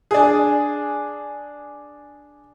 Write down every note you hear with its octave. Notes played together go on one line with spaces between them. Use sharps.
D4 G#4